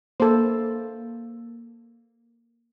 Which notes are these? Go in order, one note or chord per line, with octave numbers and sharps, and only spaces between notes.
A#3 A4 C5